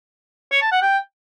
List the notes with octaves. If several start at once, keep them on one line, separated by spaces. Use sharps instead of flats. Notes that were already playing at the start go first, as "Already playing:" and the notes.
C#5
A5
F#5
G5